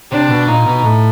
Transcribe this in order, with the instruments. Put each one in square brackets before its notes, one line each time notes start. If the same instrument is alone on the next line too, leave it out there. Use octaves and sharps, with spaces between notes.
[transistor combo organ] C3 [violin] D4
[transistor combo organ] B2
[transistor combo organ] A#2 [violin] D#4
[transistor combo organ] B2
A2